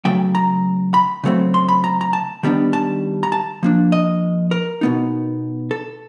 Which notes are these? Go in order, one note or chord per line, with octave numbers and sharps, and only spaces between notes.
C#3 F#3 A3 G5
A#5
B5
C#3 F#3 A3 C4
C6
B5
A#5
A#5
A5
D#3 G3 B3 D4
A5
A#5
A5
F3 A#3 D4
D#5
A#4
B2 F#3 B3 D#4
A4